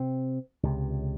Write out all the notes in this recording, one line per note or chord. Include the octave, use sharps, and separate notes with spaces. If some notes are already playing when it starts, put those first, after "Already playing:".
Already playing: C3 C4
C#2 C3